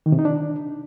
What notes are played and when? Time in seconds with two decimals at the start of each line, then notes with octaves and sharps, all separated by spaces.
0.06 D#3
0.12 C3
0.19 D#4
0.25 D4